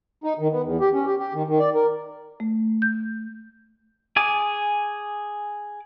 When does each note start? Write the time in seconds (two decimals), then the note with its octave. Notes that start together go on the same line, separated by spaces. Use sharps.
0.24 D#4
0.39 D#3
0.52 B3
0.64 E2
0.81 G4
0.93 C#4
1.06 G4
1.19 G4
1.34 D#3
1.48 D#3
1.59 D5
1.75 A#4
2.40 A3
2.82 G6
4.16 G#4 G#5 D6